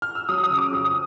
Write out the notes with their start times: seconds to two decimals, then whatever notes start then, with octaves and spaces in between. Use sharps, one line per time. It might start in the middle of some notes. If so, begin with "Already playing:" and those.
0.02 F6
0.15 E6
0.29 F#3 D#6
0.37 E6
0.44 D#6
0.50 C#3
0.58 D6
0.72 F2 D#6
0.85 D#6